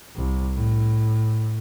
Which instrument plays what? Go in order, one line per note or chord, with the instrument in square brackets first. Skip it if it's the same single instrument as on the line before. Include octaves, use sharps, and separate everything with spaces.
[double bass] C2
A2